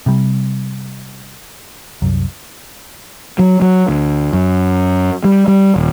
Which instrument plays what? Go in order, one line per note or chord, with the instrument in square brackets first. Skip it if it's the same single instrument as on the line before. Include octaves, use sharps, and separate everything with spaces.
[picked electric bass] C3 G3
C2 F#2
[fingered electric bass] F#3
F#3
D2
F#2
G3
G3
D#1